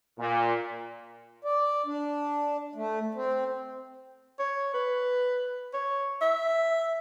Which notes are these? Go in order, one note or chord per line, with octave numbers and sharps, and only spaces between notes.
A#2
D5
D4
A3
C4
C#5
B4
C#5
E5